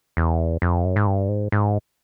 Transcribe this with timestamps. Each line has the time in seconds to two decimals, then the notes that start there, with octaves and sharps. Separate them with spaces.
0.17 E2
0.62 F2
0.85 F#2
0.96 G#2
1.07 G2
1.29 G#2
1.52 G#2